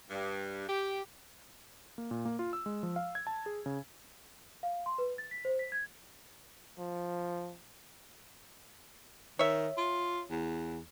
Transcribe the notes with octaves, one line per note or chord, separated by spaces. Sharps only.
G2
G4
A#3
A#2
A#3
F4
E6
G#3
F3
F5
G#6
A5
G#4
C#3
F5
C6
B4
A6
B6
C5
B6
G#6
F3
D#3 C#5 E5
F4
E2